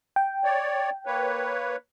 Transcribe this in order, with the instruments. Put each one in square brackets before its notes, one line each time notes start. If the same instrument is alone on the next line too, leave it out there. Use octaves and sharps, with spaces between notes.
[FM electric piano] G5
[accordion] C#5 D5
A#3 B4 C#5